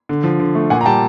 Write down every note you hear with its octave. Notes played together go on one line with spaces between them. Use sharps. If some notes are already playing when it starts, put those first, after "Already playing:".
D3
F3
D3
A3
A#2 F#5 G#5
A#5
G3 G5 A5